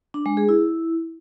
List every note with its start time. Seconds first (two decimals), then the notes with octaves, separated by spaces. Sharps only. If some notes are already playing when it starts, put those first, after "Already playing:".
0.14 D4
0.26 G#3
0.37 G#4
0.49 E4